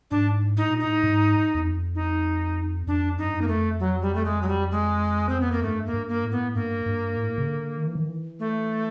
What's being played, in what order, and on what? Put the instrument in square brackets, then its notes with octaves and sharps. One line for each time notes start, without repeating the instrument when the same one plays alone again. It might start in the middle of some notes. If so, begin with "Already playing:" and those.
[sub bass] G#2 [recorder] D4
[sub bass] A2 [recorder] D#4
[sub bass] A#2
[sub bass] A2 [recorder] D#4
[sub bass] G#2
E2
F2
[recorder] D#4
[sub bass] F2 [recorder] D4
[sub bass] F#2 [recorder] D#4
[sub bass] G2
F#2
[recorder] A#3
[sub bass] F2 [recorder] A3
[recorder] F#3
G3
A3
G#3
F#3
G3
G#3
C4
B3
A#3
[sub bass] G2 [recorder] A3
[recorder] A#3
[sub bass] G2
[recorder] A#3
[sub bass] A2
[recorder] B3
[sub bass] G2 [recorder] A#3
[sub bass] G2
A2
C#3
D3
D#3
E3
D#3
E3
[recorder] A3